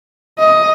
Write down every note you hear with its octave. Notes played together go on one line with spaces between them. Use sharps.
D#5